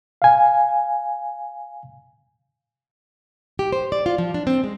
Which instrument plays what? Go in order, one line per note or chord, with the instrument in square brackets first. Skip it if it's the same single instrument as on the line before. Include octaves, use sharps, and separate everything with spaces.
[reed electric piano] F5 G#5
[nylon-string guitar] G4
C5
D5
F4
F3
D4
C4
G#3